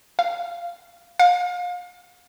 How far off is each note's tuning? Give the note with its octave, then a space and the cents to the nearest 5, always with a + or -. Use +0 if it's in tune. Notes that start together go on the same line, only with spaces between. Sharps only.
F5 -10
F5 +35